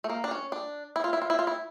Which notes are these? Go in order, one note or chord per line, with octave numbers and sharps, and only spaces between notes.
A3
A#3
D4
C#4
D4
E4
F4
E4
F4
E4
F4
E4